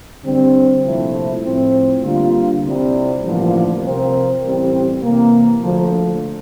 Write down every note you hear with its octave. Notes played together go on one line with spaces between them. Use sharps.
D3 G3 C4
C2 A#2 F3 A3 E4
A2 F3 C4
D3 G3 A#3 F4
C2 C3 G3
A1 G2 D3 F3 A#3
C3 F3 C4 F4 A#4
A1 A2 G3 C4 G4
C3 E3 A#3
D2 D3 F3